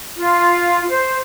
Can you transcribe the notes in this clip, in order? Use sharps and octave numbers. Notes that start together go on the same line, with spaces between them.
F4
C5